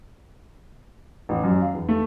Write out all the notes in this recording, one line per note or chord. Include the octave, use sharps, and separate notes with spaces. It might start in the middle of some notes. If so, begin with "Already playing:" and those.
A1
F#2
F5
E2
A3